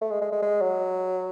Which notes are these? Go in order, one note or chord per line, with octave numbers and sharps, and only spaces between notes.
A3
G#3
G#3
G#3
G#3
F#3